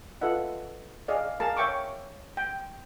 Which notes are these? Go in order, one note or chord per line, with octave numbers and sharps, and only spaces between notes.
F4 A4 B4 D#5 E5 F#5
G#4 D5 D#5 F5
G#4 A#4 F5 A5 A#5
C#5 E5 G5 C#6 D6
G5